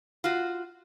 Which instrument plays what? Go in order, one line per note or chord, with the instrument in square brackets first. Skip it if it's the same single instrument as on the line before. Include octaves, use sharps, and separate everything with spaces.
[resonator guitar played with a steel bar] F4 F#4